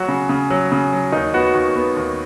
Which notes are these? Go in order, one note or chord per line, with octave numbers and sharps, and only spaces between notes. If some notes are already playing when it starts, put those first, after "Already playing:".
Already playing: F#3 F#4
C#3
C#3
F#3
C#3
F#3
D#2 D#4
B3 F#4
D#2 F#4
B3
D#2